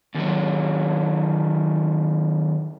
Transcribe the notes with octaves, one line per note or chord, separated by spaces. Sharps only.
D#2 F#3